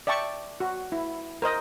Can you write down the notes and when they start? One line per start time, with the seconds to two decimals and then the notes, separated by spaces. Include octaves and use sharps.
0.07 D5 E5 G5 A5 C#6
0.60 F#4
0.92 E4
1.42 A#4 C5 D#5